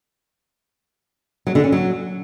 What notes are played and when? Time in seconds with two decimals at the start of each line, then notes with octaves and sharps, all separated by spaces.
1.47 F#3
1.55 D3
1.64 C#4
1.72 F#3